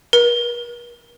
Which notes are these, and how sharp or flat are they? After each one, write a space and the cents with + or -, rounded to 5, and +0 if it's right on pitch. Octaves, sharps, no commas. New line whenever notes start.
A#4 +45